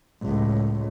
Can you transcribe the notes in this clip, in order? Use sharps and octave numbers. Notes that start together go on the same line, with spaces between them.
C#2 A2